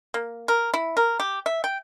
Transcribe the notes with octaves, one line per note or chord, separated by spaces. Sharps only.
A#3
A#4
E4
A#4
G4
E5
G5